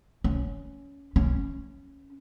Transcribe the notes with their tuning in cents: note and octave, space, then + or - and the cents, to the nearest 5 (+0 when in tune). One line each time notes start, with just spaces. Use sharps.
C#4 +15
C#4 -5